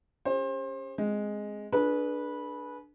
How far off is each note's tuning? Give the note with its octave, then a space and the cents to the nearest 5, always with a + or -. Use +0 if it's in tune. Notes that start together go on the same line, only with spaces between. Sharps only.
C#4 +0 G4 +45 C5 +30
G#3 +0 C4 +10
D4 +10 G#4 +35 B4 -15